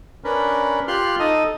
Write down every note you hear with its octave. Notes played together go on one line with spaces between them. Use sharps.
C#4 D4 A#4 B4
F4 G4 C6 F6 F#6
D#4 A4 D#5 D#6